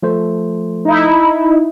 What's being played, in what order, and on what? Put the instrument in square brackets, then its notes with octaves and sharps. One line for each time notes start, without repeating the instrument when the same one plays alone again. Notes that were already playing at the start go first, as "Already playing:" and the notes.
[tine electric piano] F3 A3 C5
[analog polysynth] D#4 E4